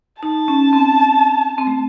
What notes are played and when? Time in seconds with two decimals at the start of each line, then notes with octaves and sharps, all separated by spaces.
0.22 D#4 A5
0.48 C#4
0.73 C4
1.58 C4
1.67 A3